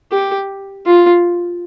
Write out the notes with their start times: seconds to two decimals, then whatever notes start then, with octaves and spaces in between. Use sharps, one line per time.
0.12 G4
0.86 F4